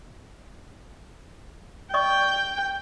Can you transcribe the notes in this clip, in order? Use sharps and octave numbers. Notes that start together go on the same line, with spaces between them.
D5 D#5 G5 C#6